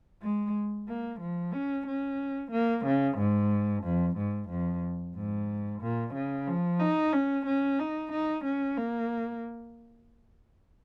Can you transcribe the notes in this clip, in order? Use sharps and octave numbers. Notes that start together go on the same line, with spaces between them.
G#3
A#3
F3
C#4
C#4
A#3
C#3
G#2
F2
G#2
F2
G#2
A#2
C#3
F3
D#4
C#4
C#4
D#4
D#4
C#4
A#3